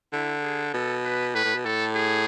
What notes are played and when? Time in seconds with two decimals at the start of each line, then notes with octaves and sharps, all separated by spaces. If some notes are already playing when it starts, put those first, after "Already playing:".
0.13 D3 E4
0.43 G#4
0.74 B2 A4
1.05 B4
1.35 A2 B4
1.45 A2
1.55 B2
1.65 A2 A4
1.95 G#4